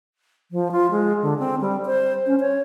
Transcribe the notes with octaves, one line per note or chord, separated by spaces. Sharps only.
F3
F4
G#3
D3
C4
G3
C5
C#4
C#5